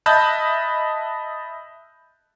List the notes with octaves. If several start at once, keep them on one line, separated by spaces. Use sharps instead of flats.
D#5 E5 A5 B5 F#6 G6